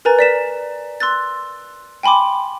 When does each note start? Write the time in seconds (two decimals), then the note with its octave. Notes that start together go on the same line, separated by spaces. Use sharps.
0.05 A#4 B4 G#5 A#5 A6
0.19 D5 B6 E7
1.00 C6 E6 F#6 A6
2.03 G5 G#5 B5 C6 D6